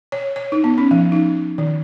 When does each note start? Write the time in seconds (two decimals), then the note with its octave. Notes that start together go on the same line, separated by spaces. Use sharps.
0.12 C#5
0.36 C#5
0.52 D#4
0.64 B3
0.78 C#4
0.91 F3
1.12 D#4
1.58 D#3